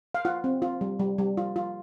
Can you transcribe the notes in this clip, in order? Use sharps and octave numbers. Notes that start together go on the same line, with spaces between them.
F5
F4 F#5
C4
F4
G3
G3
G3
F4
F4